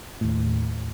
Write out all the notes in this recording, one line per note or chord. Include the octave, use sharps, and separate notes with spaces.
D#2 A2